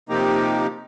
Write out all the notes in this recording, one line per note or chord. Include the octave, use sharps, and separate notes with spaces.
C3 F3 A#3 D#4 G4